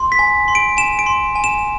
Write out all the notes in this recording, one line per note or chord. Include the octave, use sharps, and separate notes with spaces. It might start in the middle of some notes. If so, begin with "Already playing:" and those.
Already playing: C6
B6
G#5
C6
D7
G#5 E7
D7
C6
G#5
E7